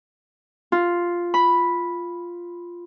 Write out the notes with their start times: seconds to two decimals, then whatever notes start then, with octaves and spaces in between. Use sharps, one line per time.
0.72 F4
1.34 B5